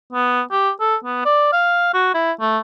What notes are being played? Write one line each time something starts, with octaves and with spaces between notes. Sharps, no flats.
B3
G4
A4
B3
D5
F5
F#4
E4
A3